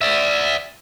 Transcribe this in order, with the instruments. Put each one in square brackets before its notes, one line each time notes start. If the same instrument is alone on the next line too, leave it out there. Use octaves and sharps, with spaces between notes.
[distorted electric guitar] D5 E5